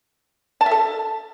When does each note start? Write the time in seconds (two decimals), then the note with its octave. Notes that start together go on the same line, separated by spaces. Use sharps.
0.61 A5
0.66 E5
0.71 A4